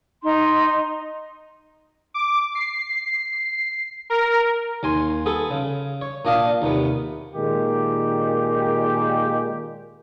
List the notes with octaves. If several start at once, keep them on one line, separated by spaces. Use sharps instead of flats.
D#4 C6
D6
C7
A#4
D#2 G#5 C6
B3 G#4 A4
C#3
C#5
A#2 D4 D#5 F5 D#6
D#2 C3 B3
A#2 D#3 G#3 G4